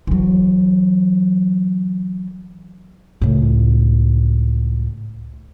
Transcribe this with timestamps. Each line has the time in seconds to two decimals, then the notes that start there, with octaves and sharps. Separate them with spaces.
0.07 E3 F#3
3.22 C#2 A2